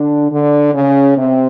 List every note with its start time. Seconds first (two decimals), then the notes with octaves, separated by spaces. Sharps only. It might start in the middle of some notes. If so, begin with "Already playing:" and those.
Already playing: D3 D4
0.32 D3 D4
0.74 C#3 C#4
1.17 C3 C4